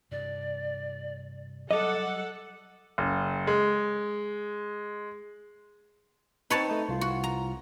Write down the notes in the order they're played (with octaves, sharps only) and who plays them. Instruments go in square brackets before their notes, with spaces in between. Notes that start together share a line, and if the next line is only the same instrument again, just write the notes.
[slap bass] G2 C3 [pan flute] D5
[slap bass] F#3 G3 [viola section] A4 F#5 [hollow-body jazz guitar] D#5 [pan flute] D6
[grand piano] F#1
G#3
[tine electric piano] C4 D#4 [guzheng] B4 C#5 A5
[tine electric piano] A3 D#4
C2 F4
[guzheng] F#4
A#5